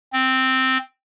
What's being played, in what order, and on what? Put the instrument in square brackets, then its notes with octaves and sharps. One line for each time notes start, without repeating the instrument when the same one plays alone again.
[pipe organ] C4